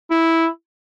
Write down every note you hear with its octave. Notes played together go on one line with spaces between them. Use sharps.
E4